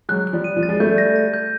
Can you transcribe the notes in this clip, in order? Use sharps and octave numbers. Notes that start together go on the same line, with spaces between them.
F#3 G#3 F#6
F#6
F3 G3
D#7
F3 G3
A6
G#3
G3 A3 G6
A#6
A#6
G6